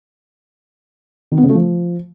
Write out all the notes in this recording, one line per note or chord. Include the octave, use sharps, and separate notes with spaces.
D#3
B3
C#3
A3
F3